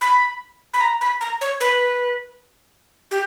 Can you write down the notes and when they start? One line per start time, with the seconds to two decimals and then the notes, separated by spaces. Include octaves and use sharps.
0.01 B5
0.74 B5
0.81 A#5
1.01 B5
1.21 A#5
1.41 C#5
1.60 B4
3.11 G4